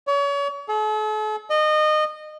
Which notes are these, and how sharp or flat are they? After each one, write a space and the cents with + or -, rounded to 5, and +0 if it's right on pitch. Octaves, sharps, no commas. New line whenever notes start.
C#5 +35
A4 -45
D#5 -25